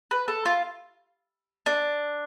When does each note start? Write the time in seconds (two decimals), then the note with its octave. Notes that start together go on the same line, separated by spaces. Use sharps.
0.11 B4
0.28 A4
0.46 F4
1.66 D4